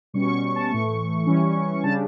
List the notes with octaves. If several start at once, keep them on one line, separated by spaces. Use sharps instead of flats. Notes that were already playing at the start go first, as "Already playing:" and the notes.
B2 G3 C#4 C#6
C#6
C#6
A5
A2 E3 A3 C#6
E3 G3 C#4
C#3 G3 D4 A5